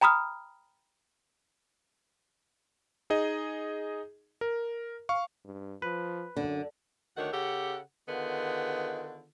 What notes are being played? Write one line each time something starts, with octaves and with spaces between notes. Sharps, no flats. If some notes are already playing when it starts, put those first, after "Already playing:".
G5 A#5 B5 D#6 F6
D#4 G#4 D#5
A#4
F5 C#6
G2
F3 B4
F#2 D3
D2 D#3 D4 C#5 F#5
C#3 G4 A4 F#5
D3 D#3 B3 F4 G#4